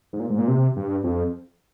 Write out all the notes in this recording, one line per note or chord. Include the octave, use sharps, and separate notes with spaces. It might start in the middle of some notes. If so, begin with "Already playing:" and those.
G#2
A#2
G#2
A#2
C3
G2
F2